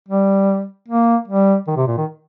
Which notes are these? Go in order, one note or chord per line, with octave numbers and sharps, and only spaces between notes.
G3
A#3
G3
D#3
C3
A#2
D#3